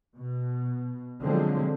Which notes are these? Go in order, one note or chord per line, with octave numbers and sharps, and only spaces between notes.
B2
D3 F3 F#3 G#3 C4